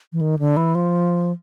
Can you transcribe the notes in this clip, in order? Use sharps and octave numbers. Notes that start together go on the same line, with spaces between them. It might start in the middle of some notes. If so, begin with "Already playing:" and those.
E3
D#3
D3
E3
F3